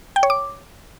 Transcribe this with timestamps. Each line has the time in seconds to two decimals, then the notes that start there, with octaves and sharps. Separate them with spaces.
0.16 G5
0.23 C#5
0.30 D6